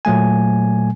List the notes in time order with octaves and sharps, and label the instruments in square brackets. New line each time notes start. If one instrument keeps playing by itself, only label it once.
[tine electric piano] A#2 F#3 A3 G#5